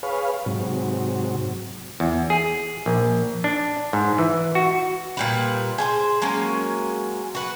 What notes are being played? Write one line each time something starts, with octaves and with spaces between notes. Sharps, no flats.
G#4 B4 C#5 F5
G#2 C3 F#3
E2
G#4
A#1
D4
G#2
E3
F#4
A#2 G3 B4
G#4 B4 C5
F#3 G#3 A#3 C#4
F#4 B4